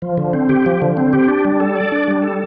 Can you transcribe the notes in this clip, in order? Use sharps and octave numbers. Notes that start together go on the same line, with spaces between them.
F3
D3
C4
G4
F3
D3
C4
G4
D4
G3
A4
D5
D4
G3
A4